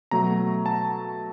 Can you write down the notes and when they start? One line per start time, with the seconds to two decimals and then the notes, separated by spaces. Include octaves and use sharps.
0.11 B2 F#3 A3 A#5
0.66 A5